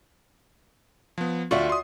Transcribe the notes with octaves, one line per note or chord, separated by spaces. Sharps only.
F3 B3
D2 F4 F#4 D5 E5 C#6
C6 D#6